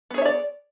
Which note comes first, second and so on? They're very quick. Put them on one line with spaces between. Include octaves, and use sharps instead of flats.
B3 G#4 C#5 E5 D5